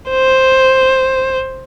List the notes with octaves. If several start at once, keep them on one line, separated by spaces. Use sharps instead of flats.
C5